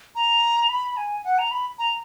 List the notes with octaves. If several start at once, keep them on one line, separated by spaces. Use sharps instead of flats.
A#5
B5
G#5
F#5
A#5
B5
A#5